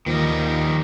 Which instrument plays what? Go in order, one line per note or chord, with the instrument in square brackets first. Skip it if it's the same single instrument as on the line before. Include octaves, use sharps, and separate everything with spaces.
[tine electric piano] D#2 F3 A#3 [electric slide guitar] D#3 G3 D#5